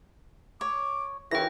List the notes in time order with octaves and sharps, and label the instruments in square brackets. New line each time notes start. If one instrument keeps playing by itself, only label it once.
[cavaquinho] C#5 [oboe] D6
[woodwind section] D#2 C#3 E3 [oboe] F#4 [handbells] G5 A#6